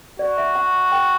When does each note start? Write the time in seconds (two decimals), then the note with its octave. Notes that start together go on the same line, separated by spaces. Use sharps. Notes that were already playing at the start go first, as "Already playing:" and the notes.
0.19 F#4 D5
0.38 E5
0.55 F#5
0.92 G5